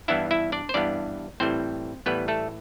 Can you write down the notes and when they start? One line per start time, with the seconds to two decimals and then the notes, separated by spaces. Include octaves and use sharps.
0.08 G2 E3 B3 D4 E4 E5
0.31 E4 E5
0.52 D4 D5
0.69 C5
0.74 G2 E3 B3 D4 D5
1.40 A2 E3 G3 C4 C5
2.06 A2 E3 G3 B3 B4
2.28 A3 A4